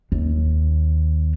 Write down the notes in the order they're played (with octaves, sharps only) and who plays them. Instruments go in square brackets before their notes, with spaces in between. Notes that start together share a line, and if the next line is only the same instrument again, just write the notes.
[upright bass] D#2